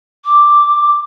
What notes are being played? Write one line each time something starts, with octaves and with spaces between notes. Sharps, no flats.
D6